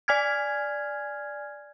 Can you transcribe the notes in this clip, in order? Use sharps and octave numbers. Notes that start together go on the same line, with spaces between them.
D5 G#5 F6 G#6